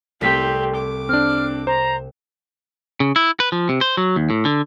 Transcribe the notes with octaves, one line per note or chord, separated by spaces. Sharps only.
C2 A3 C4 G4 B6
D6
C4 D4 F6
C5 A#5
C#3
E4
B4
F3
C3
C5
F#3
D#2
A2
D3